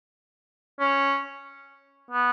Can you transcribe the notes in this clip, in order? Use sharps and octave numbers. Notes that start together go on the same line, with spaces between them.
C#4
B3